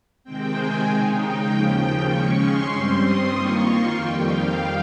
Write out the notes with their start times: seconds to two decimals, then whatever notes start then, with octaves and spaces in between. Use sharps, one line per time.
0.24 C3 D#3 G#3 C4 G5
0.55 G#5
0.85 C#3 G#3 D#4
1.16 G5
1.46 D#2 C#3 F3
2.08 C#3 G#3 C#4 C#6
2.39 C6
2.69 G2 G3 C4
3.00 D#6
3.30 D#3 A#3 F4 C#6
3.61 C6
3.92 F2 D#3 G3 G5
4.23 F5